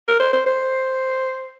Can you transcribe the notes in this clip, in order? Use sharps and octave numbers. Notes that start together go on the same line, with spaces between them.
A#4
C5
C5
C5